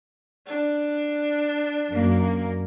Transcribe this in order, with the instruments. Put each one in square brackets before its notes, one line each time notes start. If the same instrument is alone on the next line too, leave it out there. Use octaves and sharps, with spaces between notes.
[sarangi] D4
[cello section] F#2 A#3